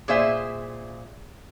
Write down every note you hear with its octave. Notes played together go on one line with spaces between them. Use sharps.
A#2 G#4 C5 E5